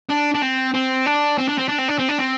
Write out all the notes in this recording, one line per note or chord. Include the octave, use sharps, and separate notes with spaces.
D4
D4
C4
C4
D4
C4
D4
C4
D4
C4
D4
C4
D4
C4